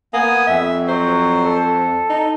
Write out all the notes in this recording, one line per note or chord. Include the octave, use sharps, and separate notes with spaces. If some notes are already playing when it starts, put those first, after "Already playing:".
A#3 B3 G#5 D#6
F2 E5
F#3 C5
A4
D#4